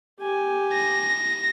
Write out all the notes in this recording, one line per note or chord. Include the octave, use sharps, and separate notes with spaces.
G4 G#5
A#6